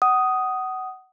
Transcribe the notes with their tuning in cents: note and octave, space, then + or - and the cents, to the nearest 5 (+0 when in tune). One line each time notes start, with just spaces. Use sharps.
F#5 +25 D#6 +0